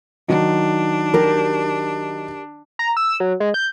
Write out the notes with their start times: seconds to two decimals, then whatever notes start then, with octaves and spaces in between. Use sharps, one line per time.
0.28 D#3 F#3 D4 D#4
1.14 G4 A#4
2.79 A#5
2.97 E6
3.20 F#3
3.40 G#3
3.54 G6